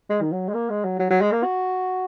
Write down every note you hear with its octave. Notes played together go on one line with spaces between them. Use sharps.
G#3
D#3
F#3
G#3
A#3
G#3
F#3
F#3
F#3
G#3
A#3
F#4